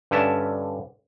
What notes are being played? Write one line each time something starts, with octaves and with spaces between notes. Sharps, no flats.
G2 D3 C#4 E5 A5